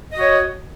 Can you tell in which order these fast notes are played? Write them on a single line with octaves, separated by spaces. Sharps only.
D#5 F#4 C#5